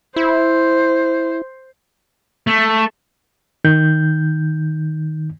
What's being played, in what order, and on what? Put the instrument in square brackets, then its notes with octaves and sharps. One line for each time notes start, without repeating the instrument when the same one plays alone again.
[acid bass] E4 [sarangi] C5
[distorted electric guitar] A3
[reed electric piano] D#3 G6